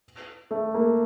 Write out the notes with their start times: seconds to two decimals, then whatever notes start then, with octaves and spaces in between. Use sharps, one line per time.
0.51 A3
0.74 A#3